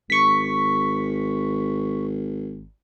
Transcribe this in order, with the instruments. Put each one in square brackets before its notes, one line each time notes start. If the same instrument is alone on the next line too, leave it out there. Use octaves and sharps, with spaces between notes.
[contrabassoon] G#1 [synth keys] C#6 B6